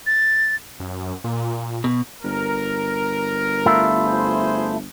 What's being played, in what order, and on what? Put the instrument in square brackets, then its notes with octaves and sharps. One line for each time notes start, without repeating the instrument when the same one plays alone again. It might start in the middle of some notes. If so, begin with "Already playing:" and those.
[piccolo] A6
[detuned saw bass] F#2
A#2
[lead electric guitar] B2
[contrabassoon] G1 [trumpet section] A#4
[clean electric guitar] A3 E4 F4
[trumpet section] G#4 C5